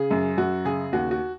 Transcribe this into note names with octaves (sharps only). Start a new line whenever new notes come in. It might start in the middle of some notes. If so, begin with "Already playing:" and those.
Already playing: C#3 G#4
F#2
F#2 F#4
C#3 G#4
D#2 F#4
F#4